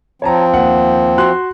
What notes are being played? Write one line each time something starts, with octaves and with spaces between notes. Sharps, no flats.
F3 C4 C#5 A5 A#5
D#2 F#5
F#4 C6 F#6